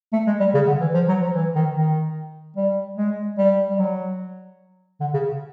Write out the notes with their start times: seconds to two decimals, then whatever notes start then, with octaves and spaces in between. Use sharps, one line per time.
0.12 A3
0.27 G#3
0.40 G3
0.54 C#3
0.67 D3
0.81 E3
0.94 F3
1.08 F#3
1.21 F3
1.35 E3
1.55 D#3
1.76 D#3
2.56 G3
2.97 G#3
3.38 G3
3.70 G3
3.79 F#3
5.00 D3
5.14 C#3